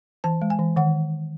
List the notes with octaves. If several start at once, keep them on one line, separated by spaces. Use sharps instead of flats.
E3 A5
G#3
G#5
E3
D#3 F#5